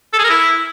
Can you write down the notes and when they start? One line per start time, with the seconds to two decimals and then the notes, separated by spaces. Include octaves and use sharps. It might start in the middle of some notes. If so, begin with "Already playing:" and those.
0.13 A4
0.19 G#4
0.24 A#4
0.30 E4